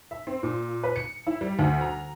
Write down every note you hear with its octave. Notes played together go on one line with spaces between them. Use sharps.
E5
C4
A#2
B4
C#7
E4
G3
D2
A#5